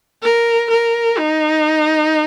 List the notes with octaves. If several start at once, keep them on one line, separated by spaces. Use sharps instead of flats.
A#4
A#4
D#4